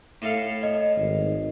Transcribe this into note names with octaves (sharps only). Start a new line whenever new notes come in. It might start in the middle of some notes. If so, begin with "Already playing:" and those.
A2 A4 F5
D#5
G#1